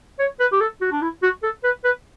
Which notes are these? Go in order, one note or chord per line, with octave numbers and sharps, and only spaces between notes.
C#5
B4
G4
A4
F#4
D4
E4
F#4
A4
B4
B4